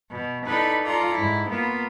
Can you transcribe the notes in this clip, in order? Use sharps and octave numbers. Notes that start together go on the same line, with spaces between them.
B2
D#4 E4 A4 B4 D5 B5
F4 A4 D5 A#5 C6
G#2 E4
A#3 B3 F4